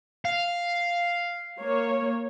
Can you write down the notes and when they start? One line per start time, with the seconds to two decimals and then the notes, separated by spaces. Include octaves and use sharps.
0.25 F5
1.58 A#3 C#5